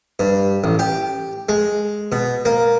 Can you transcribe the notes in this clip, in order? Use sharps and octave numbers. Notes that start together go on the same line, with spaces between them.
G2
A1
G4
G#3
B2
A#3